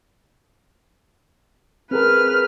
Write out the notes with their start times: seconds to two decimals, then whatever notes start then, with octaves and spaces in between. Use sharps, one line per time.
1.91 C4 G#4 A#4 B4 F6